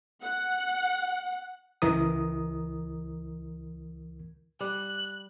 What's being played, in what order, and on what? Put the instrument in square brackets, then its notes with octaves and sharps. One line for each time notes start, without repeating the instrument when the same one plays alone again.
[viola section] F#5
[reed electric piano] C#2 E3 A#4 D#6
[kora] G3 [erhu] F#6